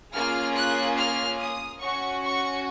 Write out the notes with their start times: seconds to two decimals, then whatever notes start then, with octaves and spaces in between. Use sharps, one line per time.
0.14 A#3 C#4 F4 G#4 F6
0.56 F#6
0.97 F6
1.40 D#6
1.81 C#4 F#4 C#6
2.23 C#6